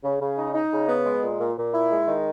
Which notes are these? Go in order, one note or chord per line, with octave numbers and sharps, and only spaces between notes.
C#3
C#3
D#4
D#4
C#3
B3
G#3
A#2
A#2
A#2
E4
G#3
D#3